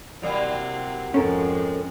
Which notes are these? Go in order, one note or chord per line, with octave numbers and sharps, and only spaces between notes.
C3 F#3 G3 A#3 C4 E4
F2 G#2 G#3 C#4 A4 A#4